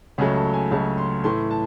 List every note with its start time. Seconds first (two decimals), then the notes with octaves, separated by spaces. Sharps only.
0.18 C#2 C#3 F#3 A3 G#4
0.36 A4
0.54 G#5
0.71 C#2 C#3 F#3 A3 A5
0.98 C6
1.24 A2 E3 A3 C6
1.51 A5